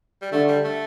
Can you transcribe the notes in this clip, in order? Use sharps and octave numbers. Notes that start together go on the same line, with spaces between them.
G3
D3 A3
G3
A3